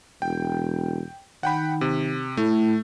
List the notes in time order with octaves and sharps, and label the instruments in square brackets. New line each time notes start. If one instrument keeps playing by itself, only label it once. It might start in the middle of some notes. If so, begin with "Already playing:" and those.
[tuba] E1 [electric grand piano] G5
[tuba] D#3 [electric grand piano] F#5 G5 B5
[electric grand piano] C3
[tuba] A2 [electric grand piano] A3